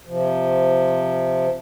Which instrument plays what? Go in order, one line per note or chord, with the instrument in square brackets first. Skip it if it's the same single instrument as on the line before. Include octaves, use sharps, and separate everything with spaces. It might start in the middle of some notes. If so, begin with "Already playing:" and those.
[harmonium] C3 F3